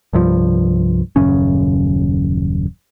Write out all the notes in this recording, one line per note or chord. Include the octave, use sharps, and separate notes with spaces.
C2 G2 F3
D#1 F#2 C#3 C#4